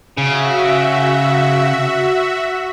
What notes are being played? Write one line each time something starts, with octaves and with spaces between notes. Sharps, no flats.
C#3 F#4 E5